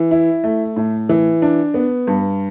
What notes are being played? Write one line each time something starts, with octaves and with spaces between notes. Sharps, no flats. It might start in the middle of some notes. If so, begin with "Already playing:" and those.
Already playing: E3
E4
A3
A2
E3
D4
B3
G2